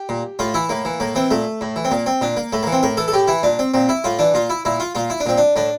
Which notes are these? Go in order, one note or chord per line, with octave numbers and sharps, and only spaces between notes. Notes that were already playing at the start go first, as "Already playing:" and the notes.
Already playing: G4
A#2
A2 F4
E3 E4
A2 A#3
E3
A2 A#3
E3 C4
A#2 A3
A2
E3
C4
A#2 A#3
C4
A#2 D4
A#3
A2 A3
E3 A#3
C4
A2 A#4
E3 A4
A4
A2 G4
E3 E4
A#2 D4
C4
A#2 C4
E4
A2 F4
E3 D4
A#2 F4
E4
A#2 E4
F4
A#2 F4
E4
D4
A#2 C4
D4
A2 D4